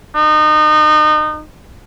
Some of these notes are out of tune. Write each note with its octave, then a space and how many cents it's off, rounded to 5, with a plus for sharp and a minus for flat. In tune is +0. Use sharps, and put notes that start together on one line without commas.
D#4 -30